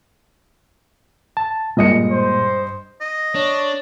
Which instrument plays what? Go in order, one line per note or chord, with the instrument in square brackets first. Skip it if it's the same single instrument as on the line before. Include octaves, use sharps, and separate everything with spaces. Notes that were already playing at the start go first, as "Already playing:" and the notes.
[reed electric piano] A5
[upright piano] G2 D#5 C#7 [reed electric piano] A#2 G#3
[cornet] C5
[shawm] D#5
[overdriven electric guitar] D4 [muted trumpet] C#5